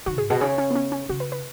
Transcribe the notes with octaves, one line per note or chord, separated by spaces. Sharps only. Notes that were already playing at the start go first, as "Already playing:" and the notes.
D#3 F#4
G#2 G#4
B2 G#4
C#3 G#4
C#4
B3
C#4
C#4
C#3 F#4
B4
B4